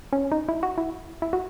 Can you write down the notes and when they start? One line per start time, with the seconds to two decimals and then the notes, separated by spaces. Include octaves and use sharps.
0.13 C#4
0.32 D#4
0.49 E4
0.63 F#4
0.78 E4
1.22 E4
1.33 F#4